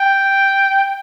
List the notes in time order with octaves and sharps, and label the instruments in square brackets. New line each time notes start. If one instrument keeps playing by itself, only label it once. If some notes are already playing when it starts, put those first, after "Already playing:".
Already playing: [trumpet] G5